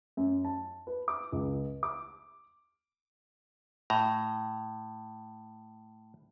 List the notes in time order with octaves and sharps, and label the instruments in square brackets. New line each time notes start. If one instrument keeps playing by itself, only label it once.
[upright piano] F#2
A5
B4
D6
C#2
D6
[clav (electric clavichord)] A2 A#5